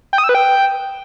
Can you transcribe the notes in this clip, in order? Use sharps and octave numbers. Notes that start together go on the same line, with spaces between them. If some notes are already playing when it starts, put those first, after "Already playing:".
G5
D#6
E6
B4
G5